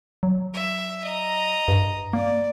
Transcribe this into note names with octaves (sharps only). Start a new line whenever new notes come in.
F#3
E5
D#5 A#5
G2
A#3 D5